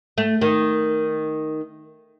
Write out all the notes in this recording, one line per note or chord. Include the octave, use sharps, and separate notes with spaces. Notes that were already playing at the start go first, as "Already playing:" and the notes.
A3
D#3